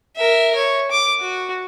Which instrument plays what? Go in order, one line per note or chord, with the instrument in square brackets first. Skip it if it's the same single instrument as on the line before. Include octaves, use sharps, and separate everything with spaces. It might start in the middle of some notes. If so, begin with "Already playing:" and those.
[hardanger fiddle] A#4 E5
C#5
D6
F#4